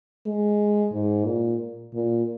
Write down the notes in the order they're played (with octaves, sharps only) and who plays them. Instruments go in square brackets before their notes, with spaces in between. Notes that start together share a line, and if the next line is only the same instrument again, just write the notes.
[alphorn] G#3
G#2
A#2
A#2